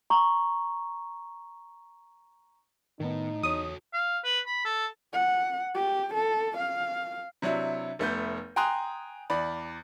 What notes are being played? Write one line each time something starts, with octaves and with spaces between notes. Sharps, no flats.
A#5 C#6
A2 D#3 B3 D#4
E2 F#4 A4 C#5 D#6
F5
B4
B5
A4
F#5
G4
A4
F5
C3 F#3 D4 E4
F1 A3 B3 G6
G5 G#5 A#5 C6 D#6 F#6
E2 D5 B5